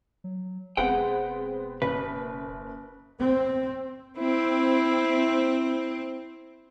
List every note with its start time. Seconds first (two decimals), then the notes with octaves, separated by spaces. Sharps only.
0.24 F#3
0.77 E1 G#3 B3 C4 G#4 F#5 G5
1.82 F#1 B4
3.20 C4
4.18 C4 E4